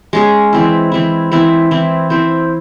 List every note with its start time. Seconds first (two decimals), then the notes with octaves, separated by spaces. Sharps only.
0.13 G#3 C#4 G#4
0.53 E3 C4 E4
0.92 E3 C4 E4
1.32 E3 C4 E4
1.71 E3 C4 E4
2.10 C4 E4 C5